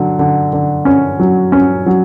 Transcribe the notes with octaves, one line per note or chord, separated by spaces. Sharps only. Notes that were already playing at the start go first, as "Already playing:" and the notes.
Already playing: D3 F#3
D3
D3
C#4
F#3
C#4
F#3